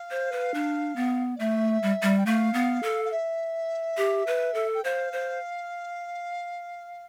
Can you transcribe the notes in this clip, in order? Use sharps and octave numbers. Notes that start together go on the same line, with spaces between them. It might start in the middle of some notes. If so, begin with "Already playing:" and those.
Already playing: F5
C5
B4
D4
B3
D5
A3 E5
G3
G3
G5
A3 F5
B3
A4
F5
E5
G4
B4
A4
G5
C5 F5
C5